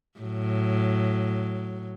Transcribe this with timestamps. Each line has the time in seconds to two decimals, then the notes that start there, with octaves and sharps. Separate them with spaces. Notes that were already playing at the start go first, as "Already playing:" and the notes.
0.19 A2 F#3